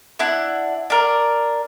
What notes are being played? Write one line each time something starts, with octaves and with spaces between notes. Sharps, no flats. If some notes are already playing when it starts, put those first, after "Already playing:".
D4 E4 F#5
D4 A#4